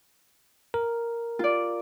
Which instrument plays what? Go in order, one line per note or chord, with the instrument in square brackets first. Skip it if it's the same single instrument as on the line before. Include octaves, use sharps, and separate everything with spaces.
[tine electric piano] A#4
[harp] F4 D5